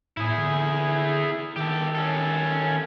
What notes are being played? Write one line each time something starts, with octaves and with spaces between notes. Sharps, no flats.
A2 E4 G#4
D3
D#3 G4 A4
C#4 A4